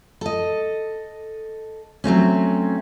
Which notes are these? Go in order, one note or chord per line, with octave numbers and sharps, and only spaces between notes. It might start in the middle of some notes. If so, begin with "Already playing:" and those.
A4 D#5
F#3 A3 C4 C#4